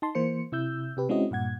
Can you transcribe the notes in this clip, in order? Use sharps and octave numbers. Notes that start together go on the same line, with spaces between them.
D#4 A5 C6
E3 A#3 C5 C#7
C3 E4 E6 G6
C3 G4 B4
G#3 C4 C#4 E4 F#4 D#5
G2 A#2 F#5 G#6